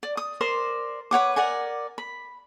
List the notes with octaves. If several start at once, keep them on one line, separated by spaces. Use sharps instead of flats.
D5
D#6
A#4 C5 D5 C6
B4 C#5 F#5 D6
A#4 D5 F#5 G#5
B5